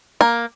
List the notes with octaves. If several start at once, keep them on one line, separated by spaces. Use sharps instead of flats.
A#3